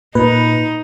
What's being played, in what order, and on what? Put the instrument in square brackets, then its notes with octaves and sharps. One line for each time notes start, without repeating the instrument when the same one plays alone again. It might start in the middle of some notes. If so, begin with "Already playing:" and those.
[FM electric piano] A#2 B4 [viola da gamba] D#4